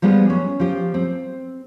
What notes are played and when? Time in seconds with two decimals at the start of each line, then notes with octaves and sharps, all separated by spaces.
0.02 F3 G3 G#3 B3
0.30 C#4
0.60 F3 G4
0.94 C4